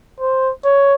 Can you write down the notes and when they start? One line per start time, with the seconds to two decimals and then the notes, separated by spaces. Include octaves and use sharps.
0.20 C5
0.64 C#5